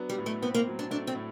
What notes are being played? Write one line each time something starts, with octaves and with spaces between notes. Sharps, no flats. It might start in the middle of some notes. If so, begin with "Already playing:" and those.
Already playing: F#3 B3 D4
G3
A2
A3
B3 C4
A#3
F#3
D4
A3 D4
C4
A2